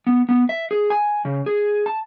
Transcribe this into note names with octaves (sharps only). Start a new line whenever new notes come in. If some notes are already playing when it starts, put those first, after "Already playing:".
B3
B3
E5
G#4
G#5
C#3
G#4
A5